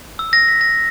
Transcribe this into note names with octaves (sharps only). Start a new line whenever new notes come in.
E6
A#6
B6
A#6